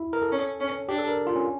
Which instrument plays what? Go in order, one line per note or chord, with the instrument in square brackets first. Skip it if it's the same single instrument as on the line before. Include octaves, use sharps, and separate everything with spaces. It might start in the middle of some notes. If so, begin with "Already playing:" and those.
Already playing: [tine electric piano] E4
A#4
A4
[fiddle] C#4
C#4
[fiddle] D4 [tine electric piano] G4
[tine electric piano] A4
A#4
F4
C#4